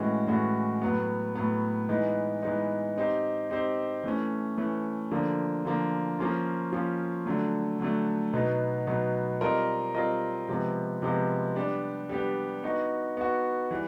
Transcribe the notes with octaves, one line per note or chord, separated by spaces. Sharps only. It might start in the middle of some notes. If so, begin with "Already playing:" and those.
Already playing: A2 E3 G#3 C#4 F#4
A2 E3 G#3 C#4 F#4
A2 F#3 B3
A2 F#3 B3
E3 G#3 B3 D#4
E3 G#3 B3 D#4
C4 D#4 G4 C5
C4 D#4 G4 C5
E3 A3 C#4
E3 A3 C#4
D3 F3 A#3
D3 F3 A#3
F3 A#3 C#4 F4
F3 A#3 C#4 F4
D3 F#3 A3
D3 F#3 A3
B2 F#3 B3 D#4
B2 F#3 B3 D#4
G3 C4 F4 A#4 D#5
G3 C4 F4 A#4 D#5
C3 F3 G#3 B3
C3 F3 G#3 B3
G3 B3 D4 G4
G3 B3 D4 G4
B3 D#4 F#4
B3 D#4 F#4
E3 G3